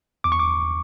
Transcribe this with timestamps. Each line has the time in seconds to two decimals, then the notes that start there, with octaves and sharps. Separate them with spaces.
0.24 E2 D6
0.32 C#6
0.39 D6